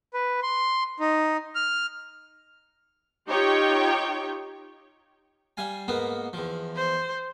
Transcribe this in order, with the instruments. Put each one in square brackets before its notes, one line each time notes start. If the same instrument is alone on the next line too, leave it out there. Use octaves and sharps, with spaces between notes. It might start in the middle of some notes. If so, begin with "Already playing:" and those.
[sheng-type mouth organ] B4
C6
D#4
F6
[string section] D#4 F4 G4 C#5 G5
[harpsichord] G3 F5 G#5
G#2 A#3 B3
E2 F3
[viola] C5